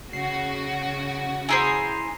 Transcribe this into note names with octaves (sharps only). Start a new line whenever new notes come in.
C#3 F#4 C7
E4 G#4 C5 G#5 A#5 C7